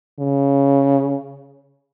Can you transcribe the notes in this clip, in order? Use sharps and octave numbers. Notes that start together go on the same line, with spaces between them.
C#3